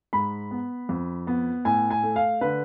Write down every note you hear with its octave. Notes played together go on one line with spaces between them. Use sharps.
G#2 B5
B3
F2
B3
A2 G#5
G#5
A3
F5
D3 B4